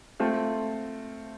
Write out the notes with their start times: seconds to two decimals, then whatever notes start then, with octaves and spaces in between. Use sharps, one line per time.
0.20 A3 C4 F4 A4